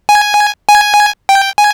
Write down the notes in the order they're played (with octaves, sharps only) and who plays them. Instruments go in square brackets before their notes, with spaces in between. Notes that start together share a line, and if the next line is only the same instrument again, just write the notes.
[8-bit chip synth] G#5
G#5
G5
G#5